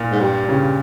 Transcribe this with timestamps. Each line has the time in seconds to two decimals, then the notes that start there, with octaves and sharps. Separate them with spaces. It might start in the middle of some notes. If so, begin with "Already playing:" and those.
Already playing: A#2
0.11 G#2
0.20 G2 G3
0.47 G2 C#3